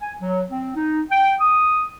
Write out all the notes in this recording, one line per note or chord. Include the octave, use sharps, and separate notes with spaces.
G#5
F#3
C4
D#4
G5
D#6